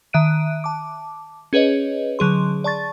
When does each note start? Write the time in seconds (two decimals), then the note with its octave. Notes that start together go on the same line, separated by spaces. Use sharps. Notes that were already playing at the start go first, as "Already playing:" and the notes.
0.13 D#3 E5 F#6 D7 D#7
0.64 A5 D6
1.53 C#4 G#4 B4 C#5 D#5
2.19 D3 F#3 G#4 C6
2.64 D5 A5 C#6 A6